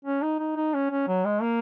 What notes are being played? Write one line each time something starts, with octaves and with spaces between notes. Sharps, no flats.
C#4
D#4
D#4
D#4
C#4
C#4
F#3
G#3
A#3